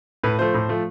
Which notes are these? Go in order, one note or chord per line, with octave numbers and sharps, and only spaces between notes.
A2 B4
F3 A3 C5
A2
F3 A3